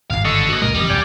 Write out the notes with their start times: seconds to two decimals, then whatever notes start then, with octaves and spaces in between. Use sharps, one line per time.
0.10 G#1 G2 F5
0.25 D3 A4 D#5 C#6
0.49 A#3 F#4
0.62 C#2 A#2 G#3 A#4 D#5
0.74 F#1 F2 E3 G3
0.90 D#1 D5 G5 G#5